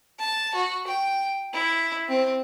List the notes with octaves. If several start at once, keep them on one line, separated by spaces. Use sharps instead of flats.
A5
F#4
G5
E4
C4